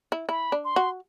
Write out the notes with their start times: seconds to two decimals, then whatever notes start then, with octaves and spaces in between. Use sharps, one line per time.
0.12 E4
0.29 E4 B5
0.52 D4
0.64 C6
0.76 F#4